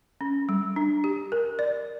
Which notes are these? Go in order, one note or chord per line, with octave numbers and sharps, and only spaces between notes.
C#4
G3
D4
G4
A#4
D5